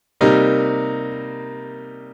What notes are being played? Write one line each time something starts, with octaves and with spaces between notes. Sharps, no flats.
C3 G3 A#3 D#4